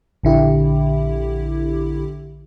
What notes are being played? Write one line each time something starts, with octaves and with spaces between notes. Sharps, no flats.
A#1 D3 E4 G4